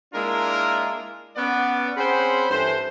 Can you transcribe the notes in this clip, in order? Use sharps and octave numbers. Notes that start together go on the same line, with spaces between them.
G#3 A#3 D4 E4 F4 A#4
B3 C#4 D5
C4 C#4 G#4 C5 F#5 B5
G2 E3 A4 C5